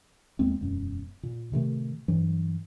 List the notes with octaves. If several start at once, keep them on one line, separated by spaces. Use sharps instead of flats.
D#2 G#3 A#3 C4
E1 F#2
A#2
A2 C3 D#3 A3
G2 E3 F#3